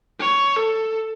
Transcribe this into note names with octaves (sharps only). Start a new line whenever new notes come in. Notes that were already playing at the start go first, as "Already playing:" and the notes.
C#5
A4